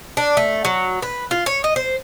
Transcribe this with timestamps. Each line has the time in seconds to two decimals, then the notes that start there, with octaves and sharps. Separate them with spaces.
0.17 D4
0.37 A3
0.65 F#3
1.02 B4
1.31 F4
1.46 C#5
1.64 D#5
1.76 C5